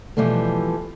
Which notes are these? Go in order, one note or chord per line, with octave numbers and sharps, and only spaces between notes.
B2 E3 F3 G3 A3